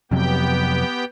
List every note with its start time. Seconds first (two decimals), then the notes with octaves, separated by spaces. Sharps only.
0.11 F2 C3 F#3 B3 G4 G5